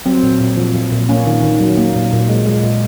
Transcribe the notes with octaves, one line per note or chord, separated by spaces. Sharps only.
F#3 C4
A#2
A#2
F3
A#2
A#2
A#3 C#4
D#3
D#3
F#3
A#3
A#2
A#2
G#3
G#3
A#2